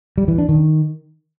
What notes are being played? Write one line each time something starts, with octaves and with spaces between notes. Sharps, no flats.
G3
E3
D4
D#3